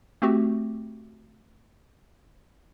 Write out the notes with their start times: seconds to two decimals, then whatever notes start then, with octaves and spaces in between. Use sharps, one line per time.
0.22 A3 C4 F#4 G4